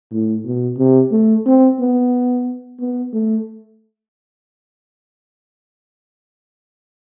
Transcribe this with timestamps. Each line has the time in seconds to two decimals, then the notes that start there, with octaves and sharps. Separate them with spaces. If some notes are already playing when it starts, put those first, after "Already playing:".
0.12 A2
0.45 B2
0.78 C3
1.12 A3
1.46 C4
1.80 B3
2.80 B3
3.13 A3